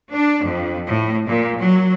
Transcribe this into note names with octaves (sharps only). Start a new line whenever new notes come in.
D4
F2
A2
A#2
F#3